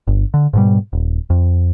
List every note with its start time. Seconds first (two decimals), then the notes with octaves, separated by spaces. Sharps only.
0.08 G1
0.34 D3
0.53 G#2 B2 G3
0.93 D#1
1.30 F2